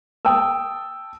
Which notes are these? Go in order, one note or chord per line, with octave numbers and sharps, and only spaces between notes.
G5 A5 D#6 E6